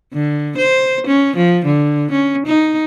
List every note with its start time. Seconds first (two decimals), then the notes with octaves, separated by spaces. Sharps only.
0.13 D3
0.58 C5
1.07 C#4
1.37 F3
1.65 D3
2.12 C#4
2.46 D#4